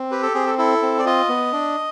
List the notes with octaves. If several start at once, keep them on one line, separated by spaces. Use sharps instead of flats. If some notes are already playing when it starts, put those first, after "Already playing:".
Already playing: C4
G4 B4
A4
C4 G#4
A4
E4 A4
C4
D5
F4 D#5
B3
D4